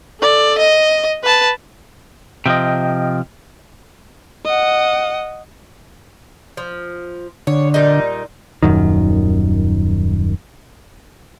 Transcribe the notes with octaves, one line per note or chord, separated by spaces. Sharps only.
A4 D5
D#5
B4 A5
C3 F3 D#5 G5
D#5 F#5
F3
D3 C#5
A#2 G3 D#4
D#1 F#2 D#3